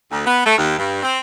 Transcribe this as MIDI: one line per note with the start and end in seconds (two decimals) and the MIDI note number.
0.12 0.23 38
0.26 0.43 59
0.46 0.54 57
0.58 0.78 39
0.78 1.00 43
1.03 1.18 60